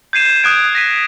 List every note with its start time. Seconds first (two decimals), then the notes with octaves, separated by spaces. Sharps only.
0.13 G6 G#6 C7 D#7 E7
0.43 D#6 F#6 G#6 D7
0.75 A#6 B6 D#7